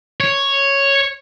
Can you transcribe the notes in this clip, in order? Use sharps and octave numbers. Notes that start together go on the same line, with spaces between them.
C#5